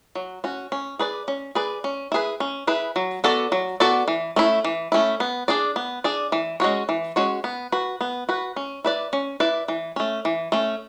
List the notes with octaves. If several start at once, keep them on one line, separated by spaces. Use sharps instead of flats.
F#3
C#4 F#4
C#4
G#4 B4 D5
C#4
G#4 B4 D5
C#4
E4 G#4 B4
C#4
E4 G#4 B4
F#3
B3 F#4 A4 D5
F#3
B3 F#4 A4 D5
E3
A3 C#4 E4
E3
A3 C#4 E4
B3
D4 G#4 D5
B3
D4 G#4 D5
E3
G#3 C#4 F#4 C#5
E3
G#3 C#4 F#4 C#5
B3
F#4 B4
B3
F#4 B4
C#4
E4 B4 D5
C#4
E4 B4 D5
E3
A3 C#4
E3
A3 C#4